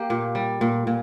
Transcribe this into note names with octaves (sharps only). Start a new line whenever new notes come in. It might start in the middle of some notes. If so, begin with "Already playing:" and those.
Already playing: A#3 G4
A#2
G3
A#2
A#2